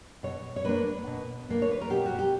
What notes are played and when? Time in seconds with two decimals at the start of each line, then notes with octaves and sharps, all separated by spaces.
0.23 B2 C#5
0.56 C#5
0.65 A#3 D4 B4
1.07 B2
1.49 A#3 D4
1.62 C#5
1.71 B4
1.81 A#4
1.90 B2 G4
2.06 F#4
2.19 G4